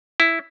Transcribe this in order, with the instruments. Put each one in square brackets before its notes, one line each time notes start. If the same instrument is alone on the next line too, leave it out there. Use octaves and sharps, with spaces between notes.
[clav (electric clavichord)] E4